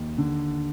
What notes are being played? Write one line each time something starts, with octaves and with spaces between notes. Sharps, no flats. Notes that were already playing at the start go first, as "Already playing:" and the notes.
Already playing: D#2
D3